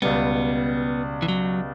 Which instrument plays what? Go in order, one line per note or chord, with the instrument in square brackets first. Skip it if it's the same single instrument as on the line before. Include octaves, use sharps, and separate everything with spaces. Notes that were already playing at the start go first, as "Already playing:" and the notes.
[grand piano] C#2 B2 G3 [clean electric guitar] B3
[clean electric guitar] E3
F#3